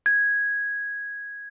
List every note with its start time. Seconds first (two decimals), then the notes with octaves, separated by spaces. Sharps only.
0.06 G#6